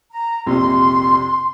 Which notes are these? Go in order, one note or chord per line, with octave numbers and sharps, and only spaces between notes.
A#5
A#1 F2 C3 C6